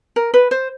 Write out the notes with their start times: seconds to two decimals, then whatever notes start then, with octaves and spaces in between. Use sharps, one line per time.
0.16 A#4
0.34 B4
0.51 C5